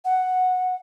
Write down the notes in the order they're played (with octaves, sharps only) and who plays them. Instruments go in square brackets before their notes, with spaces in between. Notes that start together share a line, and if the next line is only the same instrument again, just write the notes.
[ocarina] F#5